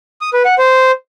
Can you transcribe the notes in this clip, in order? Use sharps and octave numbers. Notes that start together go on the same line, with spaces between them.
D#6
B4
F#5
C5